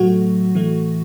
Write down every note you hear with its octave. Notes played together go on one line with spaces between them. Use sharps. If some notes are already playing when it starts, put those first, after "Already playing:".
Already playing: A2 F#3 A3 F#4
A2 E3 A3